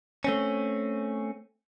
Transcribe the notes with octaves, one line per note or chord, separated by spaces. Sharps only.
A3 C4 C#4